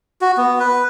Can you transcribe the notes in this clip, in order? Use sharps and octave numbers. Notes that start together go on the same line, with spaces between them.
F#4
B3
B4